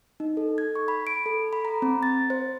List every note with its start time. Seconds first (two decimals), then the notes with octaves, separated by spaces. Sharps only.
0.20 D#4
0.37 A4
0.58 G#6
0.75 C#6
0.88 B5
1.07 D7
1.26 A4
1.53 B5
1.65 A#5
1.82 C4
2.03 A6
2.30 C5